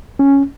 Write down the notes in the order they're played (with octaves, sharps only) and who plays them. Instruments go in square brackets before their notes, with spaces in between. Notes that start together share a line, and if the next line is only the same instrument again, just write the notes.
[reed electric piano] C#4